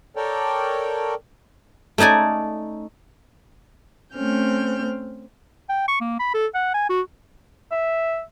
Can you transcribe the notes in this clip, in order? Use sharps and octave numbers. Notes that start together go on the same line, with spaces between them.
A4 A#4 C#5 D5 G5
A3 C#4 D#4 D5 G#5
A3 C4 C#4 F6 G6
G5
C#6
A#3
B5
A4
F#5
G#5
F#4
E5